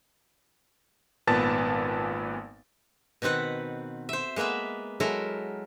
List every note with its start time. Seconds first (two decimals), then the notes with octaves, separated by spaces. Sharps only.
1.27 G#1 A#2 B3 B4 A5 A6
3.22 B2 D#3 C4 B4 F#5
4.09 C5 E5
4.36 G#3 A#3 B3 B4 E5
5.00 F#3 G#3 E4 A4 A#4